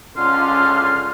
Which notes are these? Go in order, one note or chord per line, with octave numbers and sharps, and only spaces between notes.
C#2 D3 C#4 F4 C6 F6